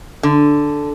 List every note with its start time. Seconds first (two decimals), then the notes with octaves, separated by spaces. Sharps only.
0.23 D3